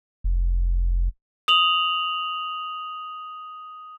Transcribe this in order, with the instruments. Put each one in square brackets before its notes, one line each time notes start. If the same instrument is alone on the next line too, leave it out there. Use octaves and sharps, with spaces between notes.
[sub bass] F1
[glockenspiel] D#6 F7 F#7